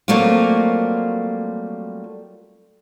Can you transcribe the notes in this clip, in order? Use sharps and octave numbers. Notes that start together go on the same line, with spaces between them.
F#3 G3 A3 A#3 C4 F4